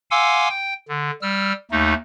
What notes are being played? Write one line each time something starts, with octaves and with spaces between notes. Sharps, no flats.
F5 F#5 G#5 C6 D6 E6
G5
D3
G3 E6 F6
D#2 A3 D#4